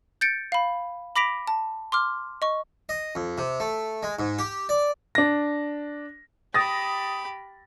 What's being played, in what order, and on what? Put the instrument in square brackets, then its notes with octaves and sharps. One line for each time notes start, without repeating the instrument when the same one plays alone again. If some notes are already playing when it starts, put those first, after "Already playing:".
[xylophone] G6 A6 C#7 D7
F5 B5
B5 D6 A#6 B6 D7 F7
A5
C6 D6 F6
D#5 C#6
[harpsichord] D#5
F2
C3
A3
G#3
G#2
G4
D5
[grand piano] D4 A#6
[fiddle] G4 B5 [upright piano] D#6 A6 A#6